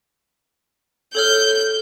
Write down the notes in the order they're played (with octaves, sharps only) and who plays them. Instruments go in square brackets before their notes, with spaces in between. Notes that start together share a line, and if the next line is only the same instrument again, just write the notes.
[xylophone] A4 C#5 F6 [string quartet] G6